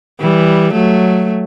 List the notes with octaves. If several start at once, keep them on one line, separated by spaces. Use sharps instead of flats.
E3 G3
F#3 A3